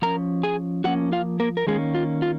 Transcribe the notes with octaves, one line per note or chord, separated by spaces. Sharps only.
F3 A#3 C#4 A#4 A#5
G#4 G#5
F3 A#3 C#4 F#4 F#5
F4 F5
A#3 A#4
A#4
D#3 G#3 A#3 C#4 G#4
F4
F4